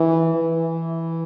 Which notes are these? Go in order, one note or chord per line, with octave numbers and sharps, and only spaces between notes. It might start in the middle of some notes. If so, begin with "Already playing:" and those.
Already playing: E3
E3